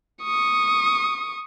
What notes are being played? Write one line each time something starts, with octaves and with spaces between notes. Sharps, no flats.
C#6 D#6